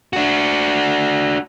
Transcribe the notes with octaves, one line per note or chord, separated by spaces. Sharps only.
D4 F#4